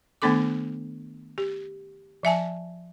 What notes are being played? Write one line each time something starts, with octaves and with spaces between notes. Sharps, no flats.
D#3 A3 B3 D4 A4 D6
G4
F3 E5 G#5 A5